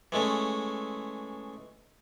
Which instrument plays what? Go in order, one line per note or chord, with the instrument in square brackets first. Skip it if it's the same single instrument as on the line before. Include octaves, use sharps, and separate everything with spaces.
[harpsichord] E3 G#3 A3 C#4